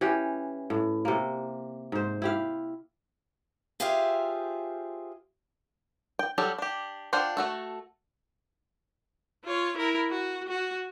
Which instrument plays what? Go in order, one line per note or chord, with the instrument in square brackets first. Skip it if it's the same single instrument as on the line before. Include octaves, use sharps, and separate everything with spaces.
[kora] E3 C#4 G4 F#5
A2
C3 A#3
G#2 C5
E4 G4 F5
[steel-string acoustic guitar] F4 G4 G#4 C5 E5 F5
[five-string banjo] G5
F#3 G3 G4 A4
D4 G4
D4 F4 C5 F#5 G5
A3 F#4 A4
[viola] F4 C#5
E4 A#4
F#4
F#4